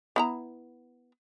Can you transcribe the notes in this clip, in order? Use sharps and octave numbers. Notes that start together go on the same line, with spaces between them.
B3 E4 A#5